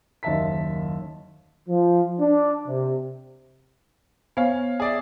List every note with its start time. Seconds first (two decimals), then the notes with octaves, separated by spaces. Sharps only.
0.23 F#1 D#2 D#5 E5 A5 B6
1.69 F3
2.20 D4
2.66 C3
4.37 B3 C5 C#5 F5 G#5
4.80 G#4 D5 E5